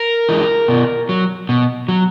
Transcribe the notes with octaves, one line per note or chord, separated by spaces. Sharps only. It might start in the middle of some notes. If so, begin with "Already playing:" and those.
Already playing: A#4
E3 G#3
B2
F#3
B2
F#3